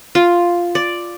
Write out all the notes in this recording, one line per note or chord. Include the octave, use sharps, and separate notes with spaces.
F4
D5